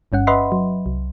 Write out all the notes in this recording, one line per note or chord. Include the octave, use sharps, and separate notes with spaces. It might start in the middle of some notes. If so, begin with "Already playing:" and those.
G1 G2 C#4 F#5
B4 D#5 E5 F#5 B5 C6
F#3
C2